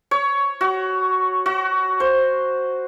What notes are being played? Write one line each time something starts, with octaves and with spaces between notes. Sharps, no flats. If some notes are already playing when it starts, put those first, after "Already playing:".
C#5
F#4
F#4
C5